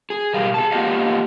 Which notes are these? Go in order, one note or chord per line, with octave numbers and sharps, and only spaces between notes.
G#4
B2 G3 G4 A#4 F5
G#4 A5
A#3 B3 F4 G4 D#5 F5